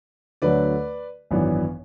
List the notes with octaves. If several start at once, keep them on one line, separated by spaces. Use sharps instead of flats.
D2 D3 F#3 A3 B4 D5
G#1 F#2 E3 B3 D4